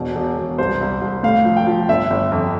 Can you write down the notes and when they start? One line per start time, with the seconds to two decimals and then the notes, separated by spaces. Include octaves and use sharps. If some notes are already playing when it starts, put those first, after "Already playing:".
Already playing: E1 B2
0.15 E1
0.37 E1
0.58 C2 C5
0.81 C2
1.01 C2
1.23 A2 F5
1.45 F3
1.57 G5
1.67 F3
1.89 G1 E5
2.10 G1
2.32 F2